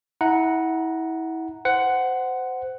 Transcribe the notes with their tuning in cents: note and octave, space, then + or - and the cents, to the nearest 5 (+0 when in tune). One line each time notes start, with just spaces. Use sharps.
E4 -30 F#5 +0 A#5 +0
C5 -20 F#5 +10